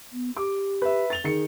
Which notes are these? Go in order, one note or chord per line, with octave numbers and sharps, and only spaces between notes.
B3
G4 D6
B4 E5
A6 F7 G7
D#3 G#4 C#7